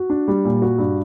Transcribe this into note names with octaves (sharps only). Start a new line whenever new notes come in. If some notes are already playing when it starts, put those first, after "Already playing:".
Already playing: F#4
D4
G3
A#2
F#4
G2